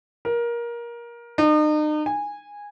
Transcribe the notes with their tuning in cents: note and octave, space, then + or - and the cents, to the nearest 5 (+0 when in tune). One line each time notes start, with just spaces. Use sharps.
A#4 +20
D#4 -40
G#5 -15